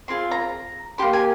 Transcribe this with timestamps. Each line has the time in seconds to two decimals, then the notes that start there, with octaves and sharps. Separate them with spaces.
0.08 C4 F4 G#4 C6
0.31 A#5
0.98 A#3 D#4 G4 C6
1.13 G#5